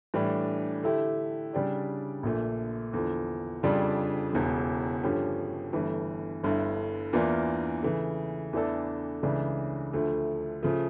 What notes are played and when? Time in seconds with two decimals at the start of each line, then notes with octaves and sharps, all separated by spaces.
0.14 A2 E3 G3 D4
0.83 D3 A3 E4 G4
1.53 C#3 G3 D4 G4 D5
2.23 A#1 A#2 A3
2.93 E2 D3 F3
3.63 F2 C#3 G3 D4 F4
4.33 E1 E2 C#3
5.03 G2 D3 F3 C#4 G4
5.73 G1 G2 E3 A3
6.43 G1 G2 D3 A3 E4
7.13 E2 E3 A#3 D4 F4
7.83 C#3 E3 A3
8.53 E2 E3 A3 D4 A4
9.23 C#2 C#3 E3 A3 D4
9.93 D2 D3 F3 A3
10.63 C#3 F3 A3